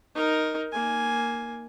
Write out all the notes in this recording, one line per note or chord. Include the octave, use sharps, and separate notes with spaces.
D#4 A#4
A#3 G#5